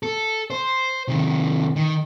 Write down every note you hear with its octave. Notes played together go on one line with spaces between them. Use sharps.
A4
C5
C3 D#3
D#3